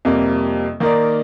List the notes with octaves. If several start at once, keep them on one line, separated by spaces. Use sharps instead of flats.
F2 C3 G3 A#3
D#3 A#3 D#4 A#4 D5